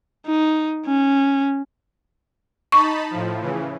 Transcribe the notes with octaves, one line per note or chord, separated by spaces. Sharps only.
D#4
C#4
D#4 A5 B5 C#6
A2 F3
C#3 E3